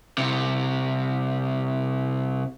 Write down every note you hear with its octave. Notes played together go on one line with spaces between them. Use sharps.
C2 C3